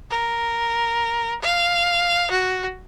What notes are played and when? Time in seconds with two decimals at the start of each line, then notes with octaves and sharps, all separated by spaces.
0.10 A#4
1.42 F5
2.31 F#4